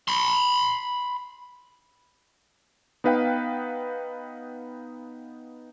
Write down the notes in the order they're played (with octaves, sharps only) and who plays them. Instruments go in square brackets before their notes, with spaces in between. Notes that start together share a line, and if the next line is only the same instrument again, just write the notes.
[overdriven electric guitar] B5 C6
[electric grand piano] B3 D#4 B4 F5 G5